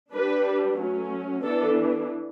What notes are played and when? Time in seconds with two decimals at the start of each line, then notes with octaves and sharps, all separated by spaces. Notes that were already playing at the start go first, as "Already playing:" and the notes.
0.12 G3 D4 B4
0.78 F#3 A3 C#4
1.43 E3 B3 D4 A4